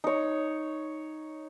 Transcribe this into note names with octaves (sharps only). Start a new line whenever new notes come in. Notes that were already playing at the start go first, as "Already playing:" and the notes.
D#4 C#5